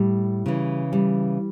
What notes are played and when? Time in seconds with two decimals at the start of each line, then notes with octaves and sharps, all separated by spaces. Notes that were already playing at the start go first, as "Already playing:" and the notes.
Already playing: A2 G3
0.46 C#3 E3
0.93 G3